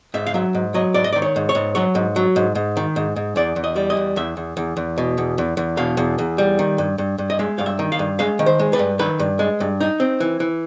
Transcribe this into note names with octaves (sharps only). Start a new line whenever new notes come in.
G#2 E5
F5
F#3 E5
G#2
F#3 D#5
G#2 D5
D#5
D#3 D5
C#5
G#2
C#5
G#2
F#3 C#5
G#2
F#3
G#2
G#2
D#3
G#2
G#2
E2 D5
E2
D#5
G3
D#5
E2
E2 E5
E2
E2
E2
B2
E2
E2
E2
B2 F5
E2
E2
G3
D#3
G2
G2
G2
D#5
G#3 E5
G2 F5
E5
D#3
F5
G2
G#3 F5
D#3
C5
G#3
B4
G2
D#3 B4
G2
G#3
G2
D#4
C4
E3
E3